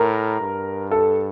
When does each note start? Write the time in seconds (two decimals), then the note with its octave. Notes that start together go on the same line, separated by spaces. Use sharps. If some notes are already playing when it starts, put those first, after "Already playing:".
Already playing: A2 A#4
0.40 G2
0.91 A4